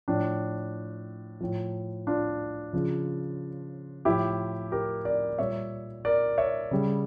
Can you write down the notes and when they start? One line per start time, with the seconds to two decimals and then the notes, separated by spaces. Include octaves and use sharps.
0.08 A2 F3 D4
1.41 A2 F3
2.07 D4 F4
2.73 C#3 F3
4.05 A2 F3 E4 G4
4.72 G4 A#4
5.05 A#4 D5
5.39 A#2 G3 C#5 E5
6.05 A#4 D5
6.38 C#5 E5
6.71 C#3 G3